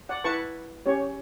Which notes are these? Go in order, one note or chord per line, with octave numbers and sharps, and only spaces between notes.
D5 F#5
E4 B4 A5 C#6
C#4 G4 C#5